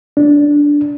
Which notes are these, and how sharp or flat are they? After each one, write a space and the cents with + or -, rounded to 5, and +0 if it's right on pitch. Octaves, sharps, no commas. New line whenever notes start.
D4 -10